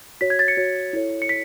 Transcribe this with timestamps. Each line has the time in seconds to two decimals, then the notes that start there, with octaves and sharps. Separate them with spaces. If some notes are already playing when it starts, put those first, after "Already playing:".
0.21 F#4 C#5 B6
0.30 G#6
0.39 A6
0.48 C#7
0.57 F#4 C#5
0.93 E4 A4 C#5
1.22 C#7
1.29 B6